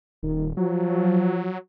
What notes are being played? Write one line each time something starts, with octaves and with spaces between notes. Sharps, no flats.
D#1 D#3
F3 F#3